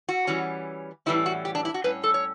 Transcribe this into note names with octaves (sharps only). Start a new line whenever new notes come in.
F#4
E3 G3 C#4
A2 E3 G3 C#4 E4
F#4
G4
D4
E4
F#4
A2 G3 C#4 B4
A4
C#5